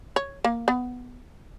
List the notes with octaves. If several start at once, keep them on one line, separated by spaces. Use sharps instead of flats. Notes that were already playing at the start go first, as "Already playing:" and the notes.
C#5
A#3
B3